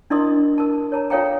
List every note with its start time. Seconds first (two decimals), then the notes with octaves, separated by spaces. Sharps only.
0.10 D4 E4 A#4 D#5 C6 D#6
0.58 A#4 A5
0.92 C#5 A5 A#5
1.10 F4 A4 C#5 F5 G5 A#5